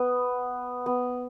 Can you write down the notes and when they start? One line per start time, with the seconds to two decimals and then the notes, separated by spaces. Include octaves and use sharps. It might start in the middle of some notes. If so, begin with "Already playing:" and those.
Already playing: B3
0.86 B3